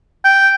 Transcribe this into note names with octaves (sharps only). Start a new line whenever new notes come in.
G5